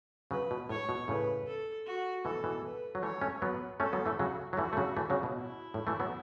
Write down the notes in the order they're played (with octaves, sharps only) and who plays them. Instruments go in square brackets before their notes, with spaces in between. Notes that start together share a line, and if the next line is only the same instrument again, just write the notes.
[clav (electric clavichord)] C#3 F#3 [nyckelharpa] B4
[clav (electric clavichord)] B2
[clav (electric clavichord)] A2 [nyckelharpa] C#5
[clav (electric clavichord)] B2
[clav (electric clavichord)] A2 C#3 [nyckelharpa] B4
[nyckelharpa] A4
F#4
[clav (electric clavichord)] B2 E3 [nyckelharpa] A4
[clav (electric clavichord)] B2 E3
[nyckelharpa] B4
[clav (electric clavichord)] F#3
[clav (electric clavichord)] E3 A3 [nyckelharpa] C#5
[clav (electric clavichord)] A3 C#4
[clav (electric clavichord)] F#3 B3 [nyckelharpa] B4
[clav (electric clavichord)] A3 C#4 [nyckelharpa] A4
[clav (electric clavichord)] F#3 B3
E3 A3
[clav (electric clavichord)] C#3 F#3 [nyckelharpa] F#4
[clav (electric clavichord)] F#3
[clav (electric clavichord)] E3 A3 [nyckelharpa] F#4
[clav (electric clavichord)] A3
C#3 F#3
E3 A3
C#3 F#3
B2
[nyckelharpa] E4
[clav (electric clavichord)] A2
E3 A3
F#3 B3